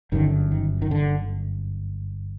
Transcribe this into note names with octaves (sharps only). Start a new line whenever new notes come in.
G1 F#2 D3 D#3
D#3
D#3
D3